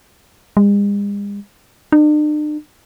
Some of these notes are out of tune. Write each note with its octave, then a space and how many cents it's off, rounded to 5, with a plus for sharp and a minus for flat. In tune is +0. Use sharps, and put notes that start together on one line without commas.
G#3 -45
D4 +45